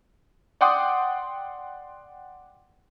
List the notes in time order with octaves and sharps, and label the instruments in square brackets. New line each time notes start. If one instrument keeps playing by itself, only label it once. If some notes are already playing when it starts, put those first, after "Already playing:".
[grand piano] D5 F#5 G5 C6 D6 D#6